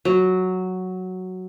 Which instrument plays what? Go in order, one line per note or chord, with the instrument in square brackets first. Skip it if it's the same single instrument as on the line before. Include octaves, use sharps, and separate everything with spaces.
[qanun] F#3